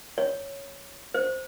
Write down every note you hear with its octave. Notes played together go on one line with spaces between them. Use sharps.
C#5
C5